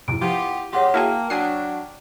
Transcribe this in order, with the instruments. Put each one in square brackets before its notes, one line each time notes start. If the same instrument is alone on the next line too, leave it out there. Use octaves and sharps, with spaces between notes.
[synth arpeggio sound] F2 G#2 C3 [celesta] E4 D7
[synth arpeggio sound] F3 [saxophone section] B3 F4 G4
[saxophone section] E2 G#3 G4 [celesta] C#5 F#5 C6
[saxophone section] A#3 [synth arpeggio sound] E4 F#4 G#4 [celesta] G5 A5 F6
[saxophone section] F#3 D4 [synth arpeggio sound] G#5 D#6 C7